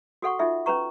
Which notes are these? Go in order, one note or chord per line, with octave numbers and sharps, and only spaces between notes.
F#4 A4 F#5 C#6
D#4 F4 A4 E5
C#4 G4 B4 A#5 C#6